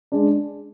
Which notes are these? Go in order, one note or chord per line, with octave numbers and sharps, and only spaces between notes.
G#3 D4